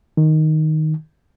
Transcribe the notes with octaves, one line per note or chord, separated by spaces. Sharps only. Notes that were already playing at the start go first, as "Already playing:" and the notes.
D#3